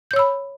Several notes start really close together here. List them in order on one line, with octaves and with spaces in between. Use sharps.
G6 C#5 E6 B5